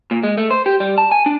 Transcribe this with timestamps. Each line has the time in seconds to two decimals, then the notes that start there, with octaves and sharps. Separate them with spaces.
0.11 A#2
0.23 G#3
0.38 A3
0.51 C5
0.66 G4
0.80 G3
0.98 A5
1.11 G#5
1.26 D4